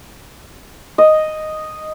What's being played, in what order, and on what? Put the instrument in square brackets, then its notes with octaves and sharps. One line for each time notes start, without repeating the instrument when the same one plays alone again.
[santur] D#5